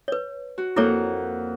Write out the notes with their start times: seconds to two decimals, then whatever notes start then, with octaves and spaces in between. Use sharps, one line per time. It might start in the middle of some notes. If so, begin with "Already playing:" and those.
0.08 B4 C#5
0.58 F#4
0.76 F2 A#3 E4 A4 C#5 F#5